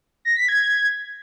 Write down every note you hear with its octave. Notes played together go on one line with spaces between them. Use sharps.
A#6
B6
G#6